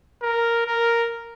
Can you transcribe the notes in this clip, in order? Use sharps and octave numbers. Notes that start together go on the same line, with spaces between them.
A#4
A#4